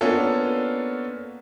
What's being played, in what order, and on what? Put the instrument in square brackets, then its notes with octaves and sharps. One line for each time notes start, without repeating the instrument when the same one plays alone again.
[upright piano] A#3 B3 C#4 D4 F4 A4